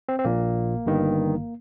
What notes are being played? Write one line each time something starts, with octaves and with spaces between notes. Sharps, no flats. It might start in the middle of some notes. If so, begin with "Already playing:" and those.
C4
C4
A#1 A#2 A#3
G1 G2 D#3